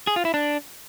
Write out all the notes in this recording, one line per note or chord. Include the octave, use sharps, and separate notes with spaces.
G#4
F4
E4
D4